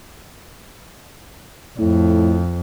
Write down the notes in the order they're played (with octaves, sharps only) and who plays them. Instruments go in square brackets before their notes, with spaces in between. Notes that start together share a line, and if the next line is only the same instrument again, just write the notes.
[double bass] F2 [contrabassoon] A2